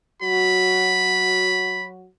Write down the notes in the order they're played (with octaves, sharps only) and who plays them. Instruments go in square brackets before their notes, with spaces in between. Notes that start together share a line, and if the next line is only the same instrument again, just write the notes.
[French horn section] F#3 F#4 [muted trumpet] B5